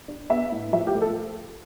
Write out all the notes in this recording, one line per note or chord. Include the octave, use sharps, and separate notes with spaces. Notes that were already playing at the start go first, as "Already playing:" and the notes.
D4
B3 E5
A2
F3 E5
G4
A3
A4